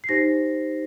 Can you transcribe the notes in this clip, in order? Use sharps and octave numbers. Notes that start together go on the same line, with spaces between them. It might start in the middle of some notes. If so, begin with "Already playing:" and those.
C7
D#4 G4 C5 A#6